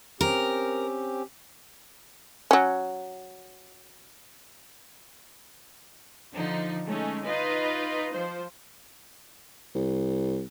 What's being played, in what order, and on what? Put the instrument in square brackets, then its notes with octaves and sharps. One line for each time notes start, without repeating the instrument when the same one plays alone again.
[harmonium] C4 C#4 G4 [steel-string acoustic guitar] A#4
[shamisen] F#3 C#4
[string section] D3 F3 D#4
G#3 A3 C#4 D#4
D#4 F4 B4 D#5
F3 C5
[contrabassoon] C2